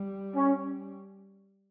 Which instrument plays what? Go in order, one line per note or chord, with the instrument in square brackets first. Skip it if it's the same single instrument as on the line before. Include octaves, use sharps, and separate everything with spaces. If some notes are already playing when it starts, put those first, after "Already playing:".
Already playing: [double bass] G3
[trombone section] C#4